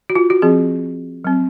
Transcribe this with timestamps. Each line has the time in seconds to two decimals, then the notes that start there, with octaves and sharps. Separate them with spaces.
0.10 F#4
0.15 F4
0.30 F#4
0.42 F3 C4 G#4
1.25 F#3 C4